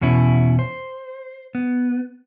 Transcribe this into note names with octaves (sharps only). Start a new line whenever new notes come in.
E2 B2 C#4 E4
C5
B3